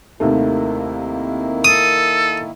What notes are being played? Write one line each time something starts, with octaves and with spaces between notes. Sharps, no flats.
D#2 C3 D#3 A3 A#3 E4
A4 D#6